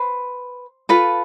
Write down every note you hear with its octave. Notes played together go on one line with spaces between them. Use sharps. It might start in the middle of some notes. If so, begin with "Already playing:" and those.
Already playing: B4 C5
F4 A4 B4